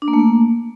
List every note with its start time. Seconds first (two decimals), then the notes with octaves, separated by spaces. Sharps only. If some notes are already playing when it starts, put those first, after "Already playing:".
0.02 D4
0.08 A#3
0.13 A3
0.19 A#3